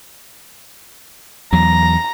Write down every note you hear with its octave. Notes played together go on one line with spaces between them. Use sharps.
E2 F#3 A#5